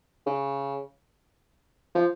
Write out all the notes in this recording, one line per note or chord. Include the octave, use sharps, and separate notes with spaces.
C#3
F3